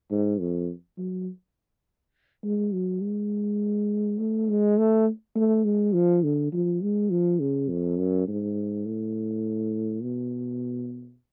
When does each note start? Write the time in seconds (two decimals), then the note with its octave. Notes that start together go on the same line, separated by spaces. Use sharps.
0.11 G#2
0.40 F2
0.98 F#3
2.44 G#3
2.73 F#3
3.03 G#3
4.18 A3
4.49 G#3
4.78 A3
5.36 A3
5.64 G#3
5.94 F3
6.23 D3
6.52 F3
6.82 G#3
7.10 F3
7.40 C#3
7.69 F2
7.98 F#2
8.27 G#2
8.85 A2
10.02 B2